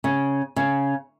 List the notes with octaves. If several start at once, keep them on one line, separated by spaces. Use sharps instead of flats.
C#3
C#3